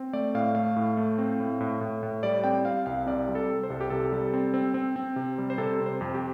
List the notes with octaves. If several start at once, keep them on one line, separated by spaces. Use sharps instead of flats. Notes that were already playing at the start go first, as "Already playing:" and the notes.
Already playing: C4
A3 D5
A2 F5
A3 F5
A2
A3
C4
A2
A2
A2
A2
G3 D5
C4 G5
C4 F5
C2 F5
C3 D5
G3
A4
G3
C5
C2 A4
G4
C3 A4
G3
C4
C4
C4
C4
C3
G3
C5
C3 A4
C4
C5
F2
G4